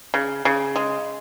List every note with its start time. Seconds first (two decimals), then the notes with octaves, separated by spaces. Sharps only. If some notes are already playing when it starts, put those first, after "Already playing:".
0.14 C#3
0.45 C#3
0.76 G#3